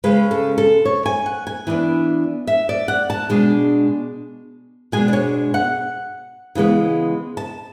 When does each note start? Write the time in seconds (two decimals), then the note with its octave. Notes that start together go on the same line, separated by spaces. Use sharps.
0.04 C#3 G#3 C#4 B4
0.31 A4
0.58 A4
0.85 C#5
1.06 G#5
1.26 F#5
1.47 G#5
1.67 E3 B3 D4
2.47 E5
2.69 D5
2.88 F#5
3.10 A5
3.30 B2 G#3 D4
4.92 B2 G#3 D4 G#5
5.08 D5
5.13 C#5
5.54 F#5
6.55 C#3 E3 G#3 B3
7.37 A5